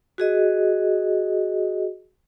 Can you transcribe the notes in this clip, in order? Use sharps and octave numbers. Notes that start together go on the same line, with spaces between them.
F#4 G#4 D#5